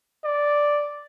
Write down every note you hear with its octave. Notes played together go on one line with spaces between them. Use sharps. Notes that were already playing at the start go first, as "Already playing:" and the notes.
D5